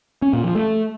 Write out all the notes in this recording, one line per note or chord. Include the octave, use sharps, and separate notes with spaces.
C#4
A#2
F3
A3